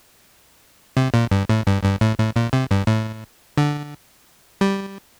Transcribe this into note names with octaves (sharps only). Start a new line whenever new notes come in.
C3
A#2
G2
A2
G2
G2
A2
A2
A#2
C3
G2
A2
D3
G3